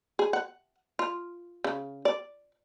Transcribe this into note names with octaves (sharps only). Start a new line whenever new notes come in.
G#4
F#5
F4
C#3
D5